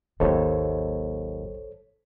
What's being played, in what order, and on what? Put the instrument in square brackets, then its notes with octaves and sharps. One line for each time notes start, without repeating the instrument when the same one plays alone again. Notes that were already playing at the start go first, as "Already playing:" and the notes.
[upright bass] G#1 F#3 [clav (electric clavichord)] D#2 [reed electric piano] A4 C5 C#5